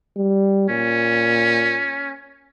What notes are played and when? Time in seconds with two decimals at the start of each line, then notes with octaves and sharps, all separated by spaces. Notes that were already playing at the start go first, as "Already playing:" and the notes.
0.17 G3
0.70 A#2 C#4